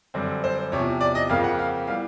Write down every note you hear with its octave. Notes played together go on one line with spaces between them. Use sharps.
F#2 D3 G3 C4
C5
E2 C3 F3 C#5
D5
D#5
F2 C#3 F3 A#3 F5
F#5
F5
E3 G3 B3 F5